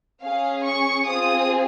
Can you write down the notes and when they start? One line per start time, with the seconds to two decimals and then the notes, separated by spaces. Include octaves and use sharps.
0.22 C#4 G#4 F5
0.64 C#6
1.06 C4 F4 G#4 D#6